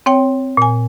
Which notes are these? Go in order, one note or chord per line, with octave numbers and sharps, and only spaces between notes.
C4 C#5 G5
A#2 G#5